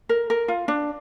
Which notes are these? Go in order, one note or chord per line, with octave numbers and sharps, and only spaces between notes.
A#4
A#4
F4
D4